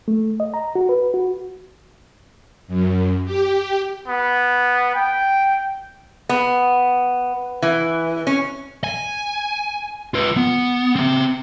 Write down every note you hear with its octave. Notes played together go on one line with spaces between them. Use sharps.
A3
D#5
A#5
F#4
B4
F#4
F#2
G4
B3
G5
B3
E3
C#4
G#5
F4 B4
B3
C4 E5